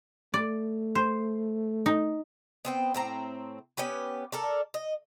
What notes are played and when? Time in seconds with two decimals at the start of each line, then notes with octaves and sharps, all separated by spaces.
0.34 A3 D5
0.95 C5
1.86 D#4
2.65 B3 C4 G5
2.94 A2 C4 A#5
3.77 B3 C#4 G4 B4
4.32 A4 A#4 D5
4.74 D#5